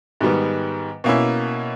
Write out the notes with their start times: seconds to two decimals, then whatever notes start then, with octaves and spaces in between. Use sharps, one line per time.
0.21 G#2 D#3 G3 B3
1.04 B2 A#3 C#4 E4